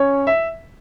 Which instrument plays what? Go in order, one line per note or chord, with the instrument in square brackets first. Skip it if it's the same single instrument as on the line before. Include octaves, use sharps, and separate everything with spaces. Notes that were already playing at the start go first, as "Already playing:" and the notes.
Already playing: [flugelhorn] C#4 [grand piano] C#5
[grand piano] E5